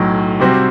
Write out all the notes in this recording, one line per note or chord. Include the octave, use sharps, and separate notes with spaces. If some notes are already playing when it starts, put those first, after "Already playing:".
Already playing: B1 A2 F#3
C3 G3 C4 F#4 C5